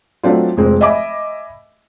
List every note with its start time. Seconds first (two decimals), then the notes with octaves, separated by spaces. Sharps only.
0.23 F#3 A3 C4 D4 F4
0.57 F1 G#3 C4
0.81 D#5 E5 G#5 B5 D6